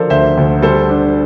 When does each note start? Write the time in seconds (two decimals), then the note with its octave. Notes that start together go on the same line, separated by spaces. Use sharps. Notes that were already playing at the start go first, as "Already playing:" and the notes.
Already playing: D3 F3 A4 A#4 C5 D5
0.10 D2 C5 E5
0.37 D2
0.62 G3 A4 C5
0.89 D4